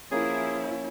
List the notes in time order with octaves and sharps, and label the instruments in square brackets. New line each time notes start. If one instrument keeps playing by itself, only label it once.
[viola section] F3 E4 [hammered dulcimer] A#3 C#4 [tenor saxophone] G#4